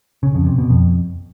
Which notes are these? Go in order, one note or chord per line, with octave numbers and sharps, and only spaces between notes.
C#3
F2
C3
B2
F2